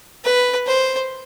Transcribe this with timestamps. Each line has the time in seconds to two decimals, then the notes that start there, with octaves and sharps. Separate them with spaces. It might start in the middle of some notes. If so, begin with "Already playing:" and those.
0.25 B4
0.67 C5